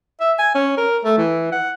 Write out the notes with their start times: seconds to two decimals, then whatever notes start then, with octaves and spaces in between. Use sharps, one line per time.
0.21 E5
0.39 G#5
0.55 C#4
0.77 A#4
1.04 A3
1.18 E3
1.53 F#5